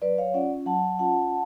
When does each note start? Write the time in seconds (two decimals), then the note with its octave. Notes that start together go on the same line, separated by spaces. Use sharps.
0.02 F#3 B4 D5
0.18 C#5 F5
0.34 C#4 F4 D5 F#5
0.66 F#3 F#5 A5
0.99 C#4 F4 F#5 A5